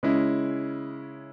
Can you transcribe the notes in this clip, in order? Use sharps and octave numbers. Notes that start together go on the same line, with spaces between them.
C#3 G#3 C#4 E4